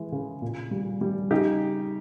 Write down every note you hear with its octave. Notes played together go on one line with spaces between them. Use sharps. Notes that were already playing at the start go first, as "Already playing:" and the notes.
Already playing: E3 G#3
C#3
A#2
G3
G3
C#3 D#4 G4